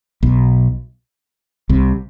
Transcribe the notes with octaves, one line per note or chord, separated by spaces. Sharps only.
B1 B2
C2 C3